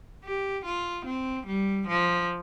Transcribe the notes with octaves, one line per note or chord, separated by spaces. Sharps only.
G4
F4
C4
G3
F3